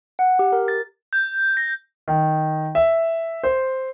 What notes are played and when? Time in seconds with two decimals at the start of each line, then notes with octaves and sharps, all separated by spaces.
0.19 F#5
0.39 G4
0.52 A#4
0.68 A6
1.13 G6
1.57 A#6
2.08 D#3
2.75 E5
3.43 C5